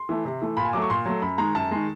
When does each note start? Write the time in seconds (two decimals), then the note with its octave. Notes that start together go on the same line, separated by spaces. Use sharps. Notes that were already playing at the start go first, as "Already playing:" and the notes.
Already playing: C6
0.09 E3 A3
0.25 C3
0.41 E3 A3
0.57 A#2 B5
0.65 G#5
0.73 F#3 A3 D6
0.82 C#6
0.90 A#2 C6
1.06 F#3 A3
1.22 F#2 B5
1.38 D#3 G#3 A#5
1.55 F#2 A5
1.71 D#3 G#3